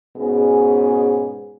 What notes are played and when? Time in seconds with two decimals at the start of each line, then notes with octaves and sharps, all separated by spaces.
0.17 G#2 B2 C#4 G#4